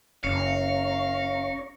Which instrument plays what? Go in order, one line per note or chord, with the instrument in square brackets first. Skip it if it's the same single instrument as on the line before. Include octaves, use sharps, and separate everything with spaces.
[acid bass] F#1 [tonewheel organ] C#4 A#5 C#6 [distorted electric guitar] F5 [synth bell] C#7